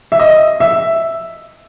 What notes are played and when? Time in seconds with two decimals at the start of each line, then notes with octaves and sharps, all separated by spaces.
0.12 E5
0.20 D#5
0.60 E5